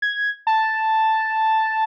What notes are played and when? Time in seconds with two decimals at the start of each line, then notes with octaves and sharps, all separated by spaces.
0.02 G#6
0.47 A5